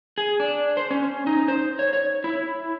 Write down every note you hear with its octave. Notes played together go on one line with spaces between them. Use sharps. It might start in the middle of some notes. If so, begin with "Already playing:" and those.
G#4
D4
C5
C#4
D#4
C5
C#5
C#5
E4